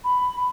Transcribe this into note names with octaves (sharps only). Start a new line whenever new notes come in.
B5